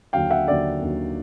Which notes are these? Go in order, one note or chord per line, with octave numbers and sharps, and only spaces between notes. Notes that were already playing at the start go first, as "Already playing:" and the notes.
D#2 D3 F#3 F5 G5
E5 F#5
D#2 D3 F#3 D5 E5
D#2 D3 F#3